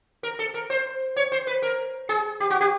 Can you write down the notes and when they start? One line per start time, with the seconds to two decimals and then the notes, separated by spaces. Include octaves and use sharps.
0.23 A#4
0.39 A4
0.54 A#4
0.70 C5
1.16 C#5
1.32 C5
1.47 B4
1.62 A#4
2.09 G#4
2.40 G4
2.50 F#4
2.61 G4